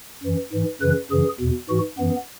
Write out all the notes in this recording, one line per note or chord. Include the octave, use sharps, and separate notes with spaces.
F#2 E3
G#2 E3
F#2 C#3 E3 B4
F#2 C#3 E3 G#4
E2 B2
G#2 E3 F#4
F#2 E3 B3